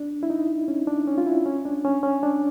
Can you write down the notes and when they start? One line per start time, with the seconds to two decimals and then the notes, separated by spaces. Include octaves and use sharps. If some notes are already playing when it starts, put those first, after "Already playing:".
Already playing: D4
0.23 E4
0.30 D#4
0.68 C#4
0.87 D4
1.08 C#4
1.18 F4
1.27 E4
1.46 C#4
1.65 D4
1.85 C#4
2.03 C#4
2.23 D4